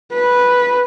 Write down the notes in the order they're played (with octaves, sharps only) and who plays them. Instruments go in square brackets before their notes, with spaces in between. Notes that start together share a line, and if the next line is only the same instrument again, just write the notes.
[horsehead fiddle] B4